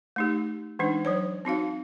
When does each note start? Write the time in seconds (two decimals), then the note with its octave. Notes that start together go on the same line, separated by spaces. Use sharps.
0.16 A3 D#4 G4
0.79 E3 G#3 D4 D#4
1.05 F#3 C5 C#5
1.45 C4 D#4 F#4 F5